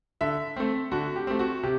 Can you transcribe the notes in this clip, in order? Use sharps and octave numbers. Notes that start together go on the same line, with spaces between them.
D3 E5
A3 C4
D3 F#4
G4
A3 C4
F#4
C3 G4